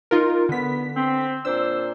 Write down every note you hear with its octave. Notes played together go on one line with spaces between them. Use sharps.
D#4 F4 A#4
D3 B3 B6
C4
A#2 D4 C5 E6